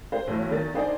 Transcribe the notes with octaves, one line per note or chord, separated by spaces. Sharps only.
C5
B1 A2 E3
E2 D#3 A6
D4 D#4 C5 D5 D#5 G#5